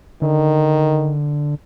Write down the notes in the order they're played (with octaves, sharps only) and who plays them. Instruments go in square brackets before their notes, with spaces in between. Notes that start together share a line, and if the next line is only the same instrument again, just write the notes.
[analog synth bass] D3 [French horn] D#3